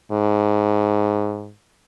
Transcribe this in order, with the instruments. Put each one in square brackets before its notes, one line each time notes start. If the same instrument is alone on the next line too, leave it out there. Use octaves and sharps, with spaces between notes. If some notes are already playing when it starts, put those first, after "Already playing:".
[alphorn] G#2